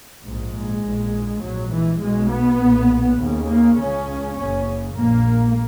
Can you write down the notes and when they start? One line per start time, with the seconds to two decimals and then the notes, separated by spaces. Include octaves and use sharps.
0.24 A#1 G#2
0.54 G#3
0.82 A#1 G#2
1.42 A#1 G#2 F#3
1.71 E3
2.01 B1 B2 G#3
2.30 B3
2.60 B1 A#2
3.19 D#2 C#3
3.48 A#3
3.78 C#2 C#3 C#4
4.37 F#1 F#2 C#3 C#4
4.95 A#1 A#2 A#3